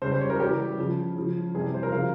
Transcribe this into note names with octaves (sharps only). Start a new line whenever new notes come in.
C#3 G3 C5
C5
C#5
A#4
C#3 E3 G3 G4
C#3 F3
C#3 F3
C3 E3 G3 G#4
C5
A#4
C#3 F3 F5